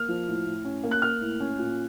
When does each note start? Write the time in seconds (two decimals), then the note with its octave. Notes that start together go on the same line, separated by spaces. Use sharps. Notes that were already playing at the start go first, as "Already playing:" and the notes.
Already playing: A#3 F6
0.08 F3
0.28 A2
0.46 A2
0.64 C#4
0.83 A#3
0.91 F#6
1.02 A#3 F6
1.21 A2
1.40 C#4
1.59 A#2